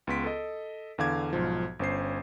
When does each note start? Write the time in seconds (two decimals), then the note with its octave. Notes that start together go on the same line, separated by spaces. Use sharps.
0.07 C#2 B3 C6 B6 D7
0.24 A4 D#5
0.98 E2 D3 F5 D6 G#6
1.33 B1 G#2 F3
1.79 G1 C#4 C5 C7